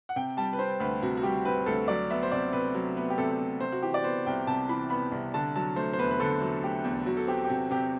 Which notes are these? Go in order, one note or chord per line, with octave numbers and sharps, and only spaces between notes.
F#5
C3 G5
G3 A5
B4
C4 C5
D2 B4
C3 F#4
F#4
G3 G4
C4 B4
D2 A4
F#3 D5
B3 E5
C5
C3 D5
C3 B4
F#3
B3
G4
C3 A4
C3
C3 C5
F#4
E3 G4
D5
B3 C5
C2 G5
C3 A5
E3 B5
B3 B5
C2
D3 A5
F#3 A5
A3 C5
C5
E2 B4
B4
D3 A4
F#3
A3 G4
E2
F#3 F#4
A4
C4 G4
G4
C3 F#4
C3 G4